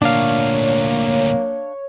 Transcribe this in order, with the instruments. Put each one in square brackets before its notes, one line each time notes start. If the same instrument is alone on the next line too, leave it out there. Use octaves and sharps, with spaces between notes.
[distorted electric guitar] D2 A#2 [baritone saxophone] A#3 [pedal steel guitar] D4 F5 [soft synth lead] C#5